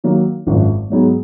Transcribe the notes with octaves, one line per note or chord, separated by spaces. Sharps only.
D#3 F#3 A#3
G#1 F#2 F3
G#2 F#3 B3 D#4 G#4